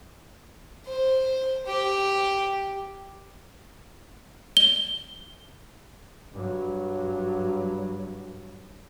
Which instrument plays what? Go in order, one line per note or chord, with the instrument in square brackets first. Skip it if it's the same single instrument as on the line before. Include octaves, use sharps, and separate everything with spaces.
[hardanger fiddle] C5
G4
[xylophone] G7
[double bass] G2 F#3